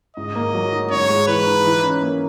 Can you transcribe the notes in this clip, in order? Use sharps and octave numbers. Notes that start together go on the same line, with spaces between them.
G#2 D#5
A#3
F#3
D#4
G#2 C#5
G#3
E3 B4
D#4
E3
C#4
A#3